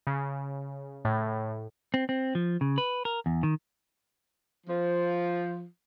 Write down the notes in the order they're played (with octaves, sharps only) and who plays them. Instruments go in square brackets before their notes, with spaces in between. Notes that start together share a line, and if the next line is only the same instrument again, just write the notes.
[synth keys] C#3
A2
[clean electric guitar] C4
C4
F3
C#3
B4
A#4
E2
D#3
[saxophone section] F3